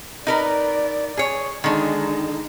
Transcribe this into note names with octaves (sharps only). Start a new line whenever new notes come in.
D#4 A#4 B4 D5
G#4 C#5
D3 D#3 G#3 D#4